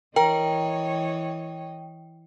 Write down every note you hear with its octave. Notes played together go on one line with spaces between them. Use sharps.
E3 A#4 C#5 D#5 G5